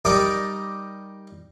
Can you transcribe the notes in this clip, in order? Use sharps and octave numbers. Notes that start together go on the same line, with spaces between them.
G3 D#4 A#4 D5 D6 D#6